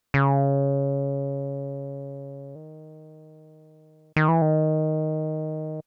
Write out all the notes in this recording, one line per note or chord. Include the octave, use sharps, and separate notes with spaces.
C#3
D#3
D#3
E3
D#3